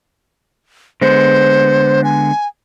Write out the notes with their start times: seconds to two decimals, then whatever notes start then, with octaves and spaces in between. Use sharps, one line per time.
1.01 D3 G#3 B3 C5
2.04 G#5